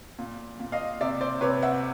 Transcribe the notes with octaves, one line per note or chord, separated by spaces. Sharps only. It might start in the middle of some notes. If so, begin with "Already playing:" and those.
A#2
A#2
D#5 F5
C3 D5 E5
C5 D5
C3 B4 C#5
E5 F#5